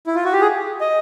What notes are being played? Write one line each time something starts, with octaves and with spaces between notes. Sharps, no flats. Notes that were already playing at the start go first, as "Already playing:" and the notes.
E4
F4
F#4
G4
G#4
D#5